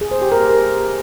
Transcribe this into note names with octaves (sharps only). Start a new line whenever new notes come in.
G#4
C5
G4
A#4